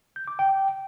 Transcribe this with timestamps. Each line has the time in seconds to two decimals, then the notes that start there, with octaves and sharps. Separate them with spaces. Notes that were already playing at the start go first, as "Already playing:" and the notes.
0.16 G6
0.28 D6
0.39 G5